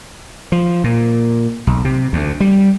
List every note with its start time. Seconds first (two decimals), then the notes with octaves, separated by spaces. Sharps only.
0.52 F3
0.84 A#2
1.67 B1
1.85 C3
2.13 D2
2.40 G3